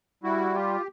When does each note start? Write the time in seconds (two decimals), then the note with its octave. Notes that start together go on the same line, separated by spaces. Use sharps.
0.23 G3 E4 F#4
0.55 F4 G4